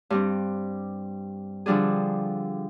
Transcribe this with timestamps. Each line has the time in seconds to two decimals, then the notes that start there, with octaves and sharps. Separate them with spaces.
0.10 G2 G3 C4
1.66 D3 F3 G3 D4 G#4